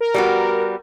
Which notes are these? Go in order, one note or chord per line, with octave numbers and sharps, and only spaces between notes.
A#4
G3 B3 F#4